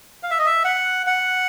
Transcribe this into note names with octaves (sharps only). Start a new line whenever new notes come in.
F5
E5
D#5
E5
F#5
F#5